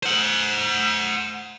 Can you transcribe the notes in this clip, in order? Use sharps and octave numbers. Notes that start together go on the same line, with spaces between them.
C5 F#5